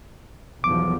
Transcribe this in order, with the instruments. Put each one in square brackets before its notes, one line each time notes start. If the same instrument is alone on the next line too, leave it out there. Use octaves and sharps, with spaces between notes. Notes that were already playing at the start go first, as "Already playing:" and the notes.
[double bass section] B1 E2 F3 [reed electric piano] D6